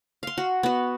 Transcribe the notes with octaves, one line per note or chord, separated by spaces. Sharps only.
F5 C6
F#4
B3 F#4